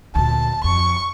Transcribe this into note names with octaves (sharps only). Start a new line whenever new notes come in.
D2 A#2 A5
F2 C#6